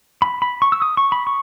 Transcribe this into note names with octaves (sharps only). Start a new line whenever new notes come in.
B5
B5
C#6
E6
D#6
C#6
B5
C#6